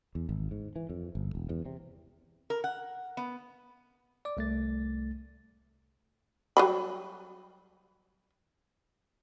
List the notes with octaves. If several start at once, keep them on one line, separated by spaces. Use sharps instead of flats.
E2
G#1
G#2
E3
F2
G1
E1
E2
C3
A#4
F#5
B3
D5 D6
C2 A3 A6
F#3 G3 B5